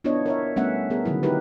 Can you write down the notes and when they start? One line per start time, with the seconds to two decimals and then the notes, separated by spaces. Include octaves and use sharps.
0.04 B3 D4 E4 F4 C#5 D#5
0.26 A#4 C#5 E5
0.56 G3 A3 B3 C#4 E5 F#5
0.90 B3 G#4 A#4
1.05 D3 D#3 F#3 E4
1.23 D#4 E4 G4 A#4 B4